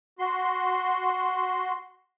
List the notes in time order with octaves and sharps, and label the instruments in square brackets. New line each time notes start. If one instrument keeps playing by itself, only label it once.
[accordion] F#4 C6